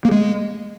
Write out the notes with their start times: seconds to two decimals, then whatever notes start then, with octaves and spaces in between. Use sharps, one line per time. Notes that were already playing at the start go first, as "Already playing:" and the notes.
0.05 A#3
0.11 G#3